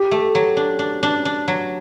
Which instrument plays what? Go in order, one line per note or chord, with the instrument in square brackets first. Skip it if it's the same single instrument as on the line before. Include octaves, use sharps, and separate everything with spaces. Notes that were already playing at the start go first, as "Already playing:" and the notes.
Already playing: [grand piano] G4
[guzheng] A3
F#3
D4
D4
D4
D4
F#3